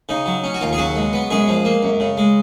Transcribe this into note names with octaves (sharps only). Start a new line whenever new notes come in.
C#3 D#4
F#3
C#4
F#4
D#2 F4
G#4
C#3 F#3 F#4
G#3
B3
F#2 G#3 G#4
F3
A#3
F#2
C#3
G#3